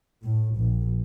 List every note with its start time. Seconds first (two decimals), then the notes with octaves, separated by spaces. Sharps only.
0.24 A2
0.56 A#1